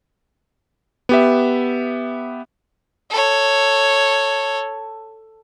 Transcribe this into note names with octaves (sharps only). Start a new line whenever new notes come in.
B3 G4 E5
A4 C#5